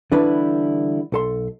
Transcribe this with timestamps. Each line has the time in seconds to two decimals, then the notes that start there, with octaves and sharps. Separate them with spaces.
0.12 D3 E3 G3 D4 E4 B4
1.12 B1 A4 C6